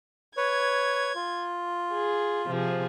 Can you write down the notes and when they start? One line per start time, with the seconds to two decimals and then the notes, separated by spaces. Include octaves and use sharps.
0.37 B4 C#5 G#6
1.15 F4
1.93 G#4
2.47 C3 F3 G#4